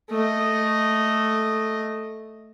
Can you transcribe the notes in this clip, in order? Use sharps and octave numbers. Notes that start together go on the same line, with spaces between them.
A3 D#5